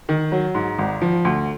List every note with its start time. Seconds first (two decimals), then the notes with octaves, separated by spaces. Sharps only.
0.09 D#3
0.32 F#3
0.55 G#2
0.79 G#1
1.01 F3
1.25 D2